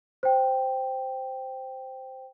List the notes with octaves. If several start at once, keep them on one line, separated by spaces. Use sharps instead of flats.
C5 G5